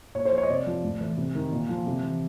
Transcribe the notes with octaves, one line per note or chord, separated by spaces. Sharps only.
A#2 C#5
C5
F3
C#5
D#5
C3 D5
F3
A2
E3
C3
D#3
A#2
F3
C3
E3